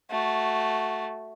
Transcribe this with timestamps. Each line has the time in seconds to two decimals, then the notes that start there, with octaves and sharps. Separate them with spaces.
0.11 A3 F#4